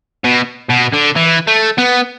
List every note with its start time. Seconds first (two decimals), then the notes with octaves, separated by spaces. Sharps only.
0.24 B2
0.70 B2
0.94 D3
1.16 E3
1.47 A3
1.78 B3